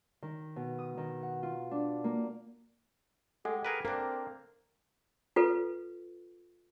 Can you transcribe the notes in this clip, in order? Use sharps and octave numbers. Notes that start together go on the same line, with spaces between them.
D#3
B2
D#6
D#3
F#5
F4
D4
A#3
G#3 G4 A4 F#5 G#5
G#4 A#4 B4
A#3 C4 D4 A#4
F4 A4 B4